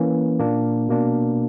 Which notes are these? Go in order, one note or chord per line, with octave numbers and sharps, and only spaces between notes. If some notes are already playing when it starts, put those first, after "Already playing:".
Already playing: E3 A#3 C#4
A#2 A#3 D4
B2 A#3 D4